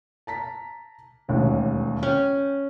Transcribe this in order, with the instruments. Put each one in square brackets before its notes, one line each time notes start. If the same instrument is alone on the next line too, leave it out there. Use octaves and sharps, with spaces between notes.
[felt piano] A5 A#5 B6
E1 A1 D#2
[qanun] C#4 [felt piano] G5